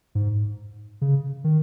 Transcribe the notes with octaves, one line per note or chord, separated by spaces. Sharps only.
G#2
C#3
D#3